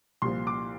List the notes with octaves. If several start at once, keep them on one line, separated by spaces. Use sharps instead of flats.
C2 A#2 F3 C6
D6